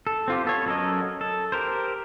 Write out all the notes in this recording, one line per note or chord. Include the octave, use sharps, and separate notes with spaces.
A4
C4 F4 G4
B3 A4 C#5
F#3 C#4 A4 A#4 D#5
A4
G4 A#4 C5